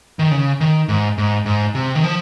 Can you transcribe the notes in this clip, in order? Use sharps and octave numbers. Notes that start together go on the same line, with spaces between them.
D#3
C#3
D#3
G#2
G#2
G#2
C3
D#3
F3